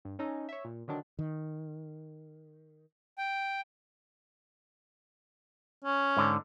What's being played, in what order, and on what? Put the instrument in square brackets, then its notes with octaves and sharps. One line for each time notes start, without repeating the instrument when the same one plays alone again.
[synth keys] G2
C#4 D#4 A4
C#5 E5
A#2
D3 D#3 F#3 D4
[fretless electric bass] D#3
[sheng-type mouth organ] G5
[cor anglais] C#4
[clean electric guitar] G#2 D3